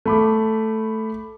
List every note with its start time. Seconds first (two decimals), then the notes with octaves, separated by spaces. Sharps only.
0.06 A3 B5 D6